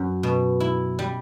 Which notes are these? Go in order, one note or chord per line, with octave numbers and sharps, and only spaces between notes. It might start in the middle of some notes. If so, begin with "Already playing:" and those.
Already playing: F#2 C#4
B2
E4
G3